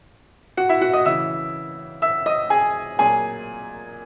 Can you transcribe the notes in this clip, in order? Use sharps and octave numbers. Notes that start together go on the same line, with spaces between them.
F#4 F#5
E4 E5
F#4 F#5
D#5 D#6
C#3 E3 E5 E6
E5 E6
D#5 D#6
G#4 G#5
A#2 F#3 G#4 G#5